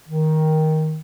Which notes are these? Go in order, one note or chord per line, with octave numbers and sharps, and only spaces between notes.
D#3